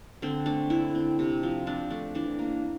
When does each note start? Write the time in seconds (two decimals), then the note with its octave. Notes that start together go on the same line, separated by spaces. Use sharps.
0.22 D3 C4
0.46 A3 D4
0.70 D3 E4
0.95 C4
1.19 C3
1.43 F3
1.66 C4 D4
1.91 A3 D4
2.15 E3 D4
2.39 A#3